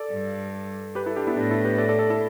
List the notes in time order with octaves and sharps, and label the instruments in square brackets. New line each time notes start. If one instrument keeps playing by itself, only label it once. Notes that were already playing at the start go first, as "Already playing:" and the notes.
Already playing: [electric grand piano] A4 D5
[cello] G2
[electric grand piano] G4 B4
E4 A4
D4 G4
B3 E4
[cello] A2 [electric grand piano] D4 G4
[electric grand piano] E4 A4
G4 B4
A4 D5
A4 D5
A4 D5
E4 A4